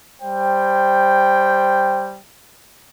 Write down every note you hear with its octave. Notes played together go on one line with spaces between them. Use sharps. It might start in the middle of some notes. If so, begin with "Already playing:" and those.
G3 C5 G5